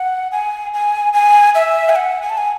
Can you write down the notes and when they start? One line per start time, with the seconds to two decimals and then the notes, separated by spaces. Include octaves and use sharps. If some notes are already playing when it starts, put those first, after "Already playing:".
Already playing: F#5
0.32 G#5
0.74 G#5
1.13 G#5
1.55 E5
1.89 G#5
1.96 F#5
2.22 G#5
2.30 A5
2.37 G#5